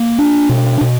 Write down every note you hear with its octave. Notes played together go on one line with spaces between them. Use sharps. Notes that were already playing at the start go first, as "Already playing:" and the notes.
Already playing: A#3
D4
B2
B2